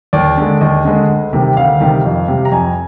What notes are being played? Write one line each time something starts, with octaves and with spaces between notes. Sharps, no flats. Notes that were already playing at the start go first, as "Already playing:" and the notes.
D#2 D5
D3 G#3
D#2 D#5
D3 G#3
D2
C3 D#3 G3
D2 F5
C3 D#3 G3
F2
C3 G3
A#5
F2 G#5